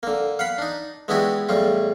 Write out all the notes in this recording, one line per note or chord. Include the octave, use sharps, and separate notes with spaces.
D3 A#3
F5 F#5 B5
D4 D#4
G#3 B3 D4 E4 F#4 G4
E2 A2 G3 F4